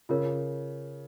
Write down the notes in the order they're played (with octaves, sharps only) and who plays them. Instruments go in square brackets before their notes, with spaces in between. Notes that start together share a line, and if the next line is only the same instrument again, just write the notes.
[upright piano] C#3 [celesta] F4 A#4 C#5